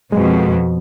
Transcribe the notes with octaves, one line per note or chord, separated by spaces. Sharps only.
F2 B2 G#3